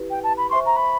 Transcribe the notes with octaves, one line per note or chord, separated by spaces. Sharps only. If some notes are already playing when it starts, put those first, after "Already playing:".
Already playing: E4 G4 B4
G5
A5
B5
C5 E5 G#5 C6 C#6
A#5
B5